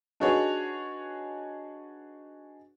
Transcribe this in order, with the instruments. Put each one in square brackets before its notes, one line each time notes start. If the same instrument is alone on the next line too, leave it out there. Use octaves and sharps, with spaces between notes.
[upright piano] D4 D#4 F#4 G#4 B4 C#5